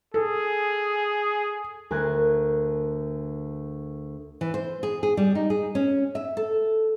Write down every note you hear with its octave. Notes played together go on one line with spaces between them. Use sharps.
G#4 A4
D2 A#4 G#5 A5 F#6 G#6
E3
C5
G#4
G#4
G3
D#4
G#4
C#4
E5
A4